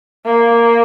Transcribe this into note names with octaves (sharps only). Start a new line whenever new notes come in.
A#3